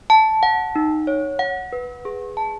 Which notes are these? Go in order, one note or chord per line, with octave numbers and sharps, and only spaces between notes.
A5
F#5
D#4
C#5
F#5
B4
G#4
A5